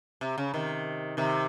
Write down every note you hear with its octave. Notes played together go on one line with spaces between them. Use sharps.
C3
C#3
C3 D#3
C3 D#3